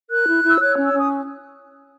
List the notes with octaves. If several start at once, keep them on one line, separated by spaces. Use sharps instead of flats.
A#4 F#6
E4
E4
E6
C#5 F#6
E6
C#4
E6
C#4 D#6